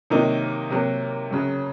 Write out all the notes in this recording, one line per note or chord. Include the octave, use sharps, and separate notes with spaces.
C3 D#3 F#3 A#3 D#4
C3 F#3 A#3
F#2 C#3 F#3